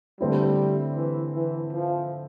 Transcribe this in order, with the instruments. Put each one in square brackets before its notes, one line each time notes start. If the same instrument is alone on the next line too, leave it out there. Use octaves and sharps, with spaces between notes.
[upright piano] D3 A3 C4 E4 [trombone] G3
[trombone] E3
E3
F3